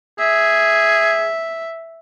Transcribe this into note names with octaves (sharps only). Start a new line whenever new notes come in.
G#4 E5